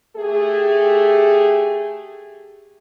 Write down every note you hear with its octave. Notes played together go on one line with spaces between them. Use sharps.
A3 G4 G#4